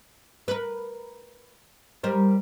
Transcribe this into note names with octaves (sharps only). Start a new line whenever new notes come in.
A#4 B4
G3 A#4 C5